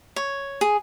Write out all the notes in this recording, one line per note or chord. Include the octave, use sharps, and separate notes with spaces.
C#5
G#4